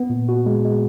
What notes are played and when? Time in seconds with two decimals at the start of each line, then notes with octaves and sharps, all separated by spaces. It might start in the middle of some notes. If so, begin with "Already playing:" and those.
Already playing: B3
0.10 A#2
0.29 F#4
0.46 G#3
0.65 G#3